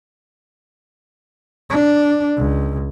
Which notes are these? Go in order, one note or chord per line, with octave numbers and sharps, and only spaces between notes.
D4
C#2